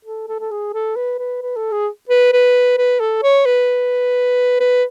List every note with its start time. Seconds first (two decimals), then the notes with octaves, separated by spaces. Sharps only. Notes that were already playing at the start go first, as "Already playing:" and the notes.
0.05 A4
0.29 A4
0.40 A4
0.51 G#4
0.74 A4
0.96 B4
1.19 B4
1.42 B4
1.56 A4
1.72 G#4
2.10 B4
2.33 B4
2.77 B4
3.00 A4
3.23 C#5
3.46 B4
4.60 B4